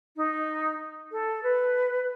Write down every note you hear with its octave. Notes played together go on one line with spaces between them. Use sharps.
D#4
A4
B4